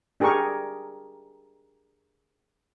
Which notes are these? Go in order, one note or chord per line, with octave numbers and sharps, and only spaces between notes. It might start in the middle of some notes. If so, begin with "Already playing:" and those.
D4 G4 G#4 A#4 C#6